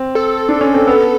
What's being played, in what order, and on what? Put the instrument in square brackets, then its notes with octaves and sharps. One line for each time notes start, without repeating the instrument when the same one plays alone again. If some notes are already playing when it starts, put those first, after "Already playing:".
Already playing: [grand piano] C4
[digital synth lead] A4
[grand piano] D4
C#4
C4
B3